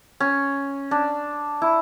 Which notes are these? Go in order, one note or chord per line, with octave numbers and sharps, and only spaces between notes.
C#4
D4
E4